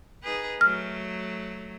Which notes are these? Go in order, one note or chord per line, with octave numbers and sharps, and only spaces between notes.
D#4 G#4 B4
F#3 A3 F6